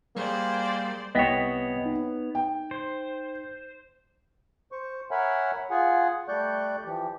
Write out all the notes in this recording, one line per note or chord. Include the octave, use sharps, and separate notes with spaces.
G3 A#3 G#4 C5 D5
C2 B3 C#5 D#5 G5 A#6 B6 E7
D#4
G5
C5
C5 C#6
A#4 C#5 E5 F#5 G#5 B5
F4 G#4 F#5 G#5
G3 A3 D5 C#6 F#6 G6
E3 F3 G4